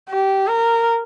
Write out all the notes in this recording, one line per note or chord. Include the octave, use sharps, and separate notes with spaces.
G4
A#4